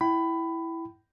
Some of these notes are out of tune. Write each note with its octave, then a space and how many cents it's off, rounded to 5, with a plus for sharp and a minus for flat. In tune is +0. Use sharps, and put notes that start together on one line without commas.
E4 +0 G5 -30 B5 +15